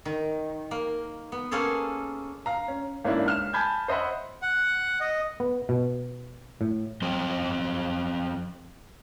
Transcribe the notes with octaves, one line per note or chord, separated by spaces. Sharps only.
D#3
A#3
B3
A#3 C#4 G#4 A4 C5
F5 A#5
C#4
G#1 A#3 C#4 D4 E4
C#2 F6 E7
G#5 A5 B5 G6 G#6
C5 D#5 E5 F#5 B5
F#5
D#5
B3
B2
A2
F3 C4 D#5